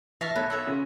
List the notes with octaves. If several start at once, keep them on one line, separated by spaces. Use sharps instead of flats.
E3 E5 F5 A5 C#6 F6 A#6
B1 A4 B4 C#5
B3 F#4 E5
C#3 C#4 F4